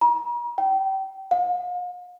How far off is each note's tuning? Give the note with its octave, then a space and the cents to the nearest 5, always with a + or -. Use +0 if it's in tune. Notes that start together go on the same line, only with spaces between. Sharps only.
A#5 +40
G5 -30
F5 +45